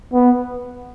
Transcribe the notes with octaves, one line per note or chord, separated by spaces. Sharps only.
B3